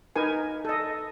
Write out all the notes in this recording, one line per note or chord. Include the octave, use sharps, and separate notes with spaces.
D#4 A#4 B4 G#5
A4 D#5